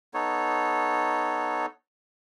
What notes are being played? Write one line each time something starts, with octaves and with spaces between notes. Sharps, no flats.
B3 D#4 A4 C#5